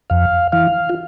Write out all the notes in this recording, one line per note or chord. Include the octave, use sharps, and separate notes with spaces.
F2 F5
E3 F5
F4